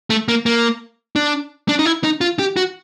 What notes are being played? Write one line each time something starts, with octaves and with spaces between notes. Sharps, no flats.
A3
A#3
A#3
D4
D4
D#4
E4
D#4
F4
G4
F#4